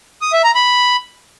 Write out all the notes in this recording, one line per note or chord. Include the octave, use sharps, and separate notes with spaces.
D#6
E5
A#5
B5